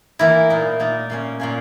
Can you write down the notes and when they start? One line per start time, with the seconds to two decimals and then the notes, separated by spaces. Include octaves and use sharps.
0.19 E3 A#3 E4 A#4
0.50 A#2 A#3 D#4
0.80 A#2 A#3 D#4
1.10 A#2 A#3 C#4
1.40 A#2 A#3 C#4